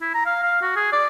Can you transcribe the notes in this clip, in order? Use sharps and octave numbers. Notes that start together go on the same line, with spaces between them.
E4
A#5
F5
F5
F#4
G#4
D5